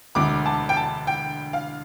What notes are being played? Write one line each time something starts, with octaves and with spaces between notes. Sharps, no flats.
E1 D2 D3 D6
A5
G5
A5
G5
F5